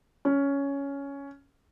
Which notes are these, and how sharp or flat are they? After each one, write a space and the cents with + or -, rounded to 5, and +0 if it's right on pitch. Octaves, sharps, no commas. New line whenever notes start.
C#4 +10